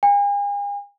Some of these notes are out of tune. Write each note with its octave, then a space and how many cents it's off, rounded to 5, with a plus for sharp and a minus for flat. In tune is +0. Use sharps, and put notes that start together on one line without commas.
G#5 -45